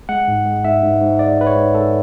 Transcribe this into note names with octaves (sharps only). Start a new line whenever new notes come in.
G#3 F#5
G#2
G#3
G#2 E5
G#2
G#2
G#3 D5
G#2 B4
C#5
G#2
G#2 A4